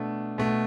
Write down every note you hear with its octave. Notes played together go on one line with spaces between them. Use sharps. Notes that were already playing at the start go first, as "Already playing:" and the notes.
Already playing: B2 A3 D4
B2 A3